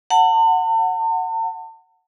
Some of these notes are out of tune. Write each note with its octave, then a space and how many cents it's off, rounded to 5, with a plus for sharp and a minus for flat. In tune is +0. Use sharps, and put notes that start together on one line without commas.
F#5 +0 A5 +40